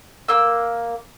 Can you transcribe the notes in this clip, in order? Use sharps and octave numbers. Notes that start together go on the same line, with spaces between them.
A#3 E6